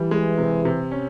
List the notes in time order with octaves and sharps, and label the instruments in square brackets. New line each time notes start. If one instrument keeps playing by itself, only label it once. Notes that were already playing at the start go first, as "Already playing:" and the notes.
Already playing: [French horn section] E3 [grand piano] G3
[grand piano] G#3
C3
C3
C#4